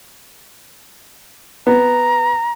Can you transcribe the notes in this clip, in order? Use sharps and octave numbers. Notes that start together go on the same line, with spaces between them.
B3 A#5